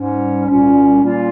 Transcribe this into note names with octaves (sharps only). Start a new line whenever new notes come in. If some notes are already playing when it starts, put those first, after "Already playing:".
Already playing: G#2 G3 C#4
C2 A#2 G3 C#4 F4
A#2 G3 A#3 C#4 F4